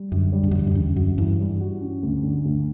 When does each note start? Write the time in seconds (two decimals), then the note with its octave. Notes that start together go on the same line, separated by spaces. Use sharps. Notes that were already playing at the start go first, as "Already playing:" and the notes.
Already playing: G3
0.12 F#2 D3
0.32 G3
0.43 G2
0.51 F#2
0.54 E2 D3
0.67 F#2
0.75 E2 C#4
0.96 F#2 F#4
1.18 G2 E3
1.39 G3
1.60 F#4
1.81 C#4
2.02 D2
2.23 D3
2.45 D2